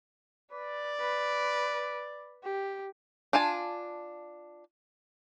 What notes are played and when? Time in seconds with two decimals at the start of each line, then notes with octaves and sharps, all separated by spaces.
0.51 B4 D5
1.00 B4
2.43 G4
3.33 D4 F4 G#5 A5